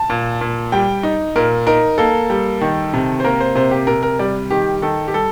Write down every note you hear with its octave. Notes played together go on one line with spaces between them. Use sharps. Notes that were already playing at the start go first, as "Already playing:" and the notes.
Already playing: A5
A#2
A#2
G3 G5
D#4
A#2 A#4
D#4 A#4
A#3 A4
G3
D#3
C3
C5
A#3 A#4
C5
C3 C5
G4
C3 A#4
A#4
G3 D5
D#3 G4
D#3 A4
G4
G3 A4